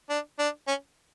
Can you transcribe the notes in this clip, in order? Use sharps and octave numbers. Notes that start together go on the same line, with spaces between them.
D4
D4
C#4